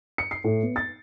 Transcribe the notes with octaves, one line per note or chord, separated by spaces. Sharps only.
C#7
C7
A2
B3
A6